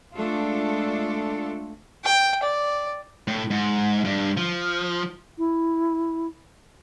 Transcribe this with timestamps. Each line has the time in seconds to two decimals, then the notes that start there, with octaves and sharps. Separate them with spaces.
0.14 G#3 A3 D4 F4 A4
2.04 G5
2.43 D5
3.28 A2
3.51 G#2
4.05 G2
4.37 F3
5.38 E4